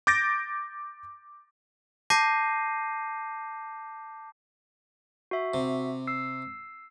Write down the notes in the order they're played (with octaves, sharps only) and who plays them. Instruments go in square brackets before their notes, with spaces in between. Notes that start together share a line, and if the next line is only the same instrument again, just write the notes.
[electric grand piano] D6 G6 A6 A#6 D7
[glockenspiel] A5 D6 G6 A#6 C7 D#7
[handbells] F#4 E5
[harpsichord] C3
[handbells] E6 C7